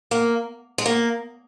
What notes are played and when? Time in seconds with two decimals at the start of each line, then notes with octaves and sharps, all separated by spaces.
0.11 A#3
0.78 G#3
0.86 A#3